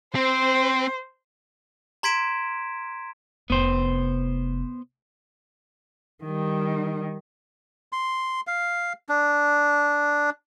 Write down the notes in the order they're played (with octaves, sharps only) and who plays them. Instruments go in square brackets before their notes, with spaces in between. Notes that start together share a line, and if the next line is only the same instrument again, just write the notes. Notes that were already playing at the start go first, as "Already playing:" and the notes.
[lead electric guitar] C4 [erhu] C5
[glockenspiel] A#5 C6 G#6 B6 D7 E7
[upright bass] F1 C3 [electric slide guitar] B3 C5
[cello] D#3 G3
[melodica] C6
F5
D4